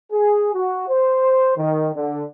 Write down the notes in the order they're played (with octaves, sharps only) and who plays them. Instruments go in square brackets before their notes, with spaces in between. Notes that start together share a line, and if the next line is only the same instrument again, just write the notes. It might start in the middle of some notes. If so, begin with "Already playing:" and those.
[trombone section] G#4
F#4
C5
D#3
D3